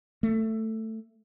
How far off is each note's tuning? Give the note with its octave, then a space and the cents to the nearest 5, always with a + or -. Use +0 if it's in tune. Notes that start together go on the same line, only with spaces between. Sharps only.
A3 +10